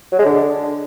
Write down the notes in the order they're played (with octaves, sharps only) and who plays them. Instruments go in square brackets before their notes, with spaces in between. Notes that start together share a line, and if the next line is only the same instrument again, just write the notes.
[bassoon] F#3
G#3
D3